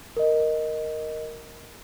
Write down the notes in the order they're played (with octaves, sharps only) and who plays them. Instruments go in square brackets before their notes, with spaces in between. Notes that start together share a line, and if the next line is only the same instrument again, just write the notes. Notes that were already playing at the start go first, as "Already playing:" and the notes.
[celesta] A#4 D#5